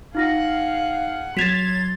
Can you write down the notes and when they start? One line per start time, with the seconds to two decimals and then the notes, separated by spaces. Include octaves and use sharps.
0.15 D#4 F4 G#4 F5 F#5 A#6
1.37 F#3 C6 G#6 A6 B6 E7 F7